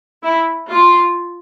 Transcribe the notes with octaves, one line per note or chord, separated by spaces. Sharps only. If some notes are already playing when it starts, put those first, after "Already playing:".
E4
F4